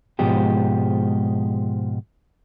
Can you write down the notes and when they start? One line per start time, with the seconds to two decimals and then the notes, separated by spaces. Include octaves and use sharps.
0.19 G#2 B2 F3 G#3 G4